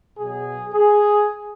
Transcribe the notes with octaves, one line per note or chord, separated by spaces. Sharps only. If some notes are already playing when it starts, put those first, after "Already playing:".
B2 F#3 G#4
G#4